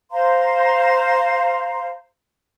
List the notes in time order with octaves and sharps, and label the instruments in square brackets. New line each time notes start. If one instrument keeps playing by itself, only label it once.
[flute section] C5 F5 A#5 C6